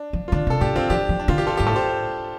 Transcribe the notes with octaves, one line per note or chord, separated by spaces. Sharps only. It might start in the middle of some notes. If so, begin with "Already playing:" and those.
Already playing: D4
F3
F4
D3 D4
C3
A4
A2 D4 G4
D3 C4 F4
F3 D4 G4
F3
D4
D3 F4
G4
F4 A4
G2 G4
A2 A4
G4 C5